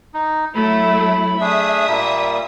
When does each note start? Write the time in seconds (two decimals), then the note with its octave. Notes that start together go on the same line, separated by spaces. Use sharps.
0.14 D#4
0.55 F#3 A3 E4 B5
1.41 A3 D4 G#4 E5 D#6
1.88 A#2 G3 A#3